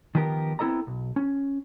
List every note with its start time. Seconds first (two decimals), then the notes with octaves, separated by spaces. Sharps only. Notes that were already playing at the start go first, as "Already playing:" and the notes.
0.15 D#3 F3 B3 G4 A#4
0.59 B3 C4 E4 A4 D#5 A#5
0.87 B1
1.16 C#4